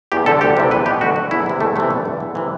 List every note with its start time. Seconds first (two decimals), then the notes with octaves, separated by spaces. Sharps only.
0.12 E2 G4
0.26 D3 A4
0.41 D2 G4
0.57 C3 E3
0.71 E2 B4
0.86 B2 G4
1.01 D2 F#4
1.16 D3
1.31 E2 E4
1.46 C3 E3
1.60 E2 A3
1.76 C3 E3 A3
1.90 G2
2.05 D3
2.20 E2
2.35 C3 E3